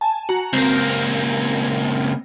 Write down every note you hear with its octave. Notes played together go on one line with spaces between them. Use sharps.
G#5 A5
F#4 A#5
C#2 A#3 C4 A#6